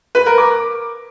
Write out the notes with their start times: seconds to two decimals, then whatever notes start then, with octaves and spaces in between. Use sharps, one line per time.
0.15 B4
0.26 A#4
0.38 D6